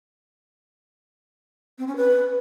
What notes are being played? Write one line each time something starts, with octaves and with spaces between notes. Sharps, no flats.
C4
C#4
B4